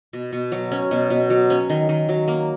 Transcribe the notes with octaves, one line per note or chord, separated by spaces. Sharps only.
B2
B2
F#3
C#4
B2
B2
F#3
C#4
D#3
D#3
F#3
A#3